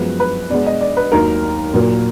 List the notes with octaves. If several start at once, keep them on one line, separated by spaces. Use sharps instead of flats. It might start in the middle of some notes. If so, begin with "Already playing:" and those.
Already playing: F#2 F3 G#3 B3 B4
B4
B2 G#3 B3 D5
D#5
D5
B4
D#2 D#3 F#3 A#3 A#4
A#2 F#3 A#3